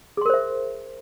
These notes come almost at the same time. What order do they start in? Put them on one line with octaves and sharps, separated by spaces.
G#4 C6 A#4 C5 E5